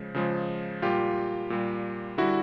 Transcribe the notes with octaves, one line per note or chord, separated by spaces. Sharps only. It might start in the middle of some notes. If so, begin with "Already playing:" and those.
Already playing: C#3 F3 G#3
C#3 F3 G#3
A#2 G3 F4 G4
A#2 G3
D3 G3 E4 F#4